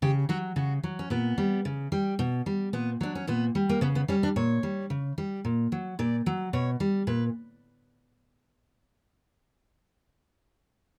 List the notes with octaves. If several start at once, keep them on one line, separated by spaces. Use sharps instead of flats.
C#3 G4
F#3 F#4
C#3 F#4
F#3
C#4
A#2 B3
G3
C#3
G3
B2
G3
A#2 B3
F#3 D4
C#4
A#2 B3
G3
A#3
C#3 B3
B3
G3 C#4
D4
A#2 C#5
G3
C#3
G3
A#2
F#3
A#2 D5
F#3
B2 C#5
G3
A#2 B4